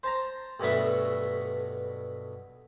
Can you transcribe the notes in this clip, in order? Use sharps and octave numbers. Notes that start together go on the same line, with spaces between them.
C5 A5 A#5
B1 G2 B2 A3 B3 E5